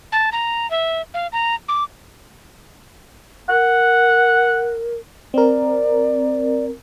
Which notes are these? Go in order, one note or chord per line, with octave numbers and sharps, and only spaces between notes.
A5
A#5
E5
F5
A#5
D6
A#4 F#5
C4 A#4 D5